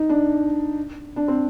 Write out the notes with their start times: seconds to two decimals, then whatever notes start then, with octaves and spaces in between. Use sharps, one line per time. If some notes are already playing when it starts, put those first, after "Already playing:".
Already playing: D#4
0.09 D4
1.16 D4
1.28 C4